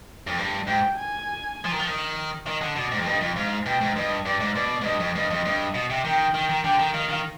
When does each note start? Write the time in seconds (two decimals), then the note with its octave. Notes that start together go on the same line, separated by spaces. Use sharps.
0.27 F2
0.38 G2
0.67 G#2 G5
0.97 G#5
1.65 F3
1.71 D#3
1.79 F3
1.87 D#3
2.46 D#3 D#5
2.61 D3
2.76 B2 D5
2.92 G#2
2.99 F2
3.06 G2 D#5
3.21 F2
3.36 G#2 F5
3.66 B2 G5
3.81 G#2
3.96 G2 D#5
4.26 G2 D5
4.40 G#2
4.55 B2 D5
4.81 G#2
4.85 G2 D#5
5.00 F2
5.15 G2 D#5
5.30 F2
5.45 G2
5.74 B2
5.90 C3
6.05 D#3 G5
6.34 D#3
6.49 D#3
6.64 D3 G5
6.79 D#3
6.94 D#3 F5
7.09 D#3